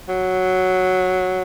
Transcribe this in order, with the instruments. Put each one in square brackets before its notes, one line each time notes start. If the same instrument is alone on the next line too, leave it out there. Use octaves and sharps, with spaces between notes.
[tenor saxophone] F#3